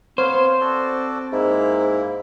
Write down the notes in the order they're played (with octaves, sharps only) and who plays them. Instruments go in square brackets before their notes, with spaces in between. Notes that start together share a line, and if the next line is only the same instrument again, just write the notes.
[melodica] B3 C#5 F5 [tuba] C4 [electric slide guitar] C5
[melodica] F#4 A4 D5
[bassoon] G#2 [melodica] A#3 E4